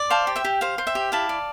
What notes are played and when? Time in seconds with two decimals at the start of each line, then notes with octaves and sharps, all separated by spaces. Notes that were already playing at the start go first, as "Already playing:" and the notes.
Already playing: D5
0.10 C5 F5 A5
0.27 G4
0.36 E5 G5
0.44 G4
0.61 C5 F5
0.78 C5
0.87 E5 G5
0.95 G4
1.12 E4 F5 A5
1.29 D5